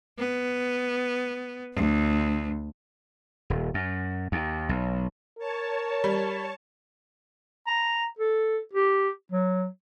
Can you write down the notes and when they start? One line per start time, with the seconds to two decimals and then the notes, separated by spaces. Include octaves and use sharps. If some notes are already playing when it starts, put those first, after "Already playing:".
0.18 B3
1.74 D2
3.50 D#1
3.74 F#2
4.32 D#2
4.69 B1
5.38 A#4 C#5 A5
6.04 G3
7.67 A#5
8.19 A4
8.73 G4
9.32 F#3